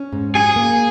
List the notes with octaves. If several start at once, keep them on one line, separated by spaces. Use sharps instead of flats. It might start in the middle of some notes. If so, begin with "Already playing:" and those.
Already playing: C#4
G#2
F#3 G#4
A#3